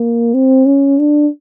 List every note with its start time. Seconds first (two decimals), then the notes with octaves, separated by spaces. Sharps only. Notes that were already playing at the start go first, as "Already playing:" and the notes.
Already playing: A#3
0.34 C4
0.66 C#4
0.99 D4